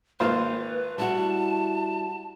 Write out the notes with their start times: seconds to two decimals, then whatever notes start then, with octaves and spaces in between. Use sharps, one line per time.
0.20 G#1 A#3 F4 B4 C5
0.98 G3 E4 F#4 A5